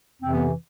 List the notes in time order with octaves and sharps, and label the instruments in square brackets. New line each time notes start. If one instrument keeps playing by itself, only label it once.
[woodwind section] F2 C3 E3 C4
B3